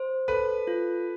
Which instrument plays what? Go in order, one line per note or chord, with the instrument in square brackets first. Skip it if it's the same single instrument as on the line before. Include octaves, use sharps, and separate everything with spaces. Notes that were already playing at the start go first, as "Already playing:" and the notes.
Already playing: [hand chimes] C5
[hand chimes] A4 [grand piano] B4
[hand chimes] F4